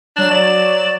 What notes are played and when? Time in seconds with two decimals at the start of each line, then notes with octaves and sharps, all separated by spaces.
0.17 F#3 D4 E7
0.31 D5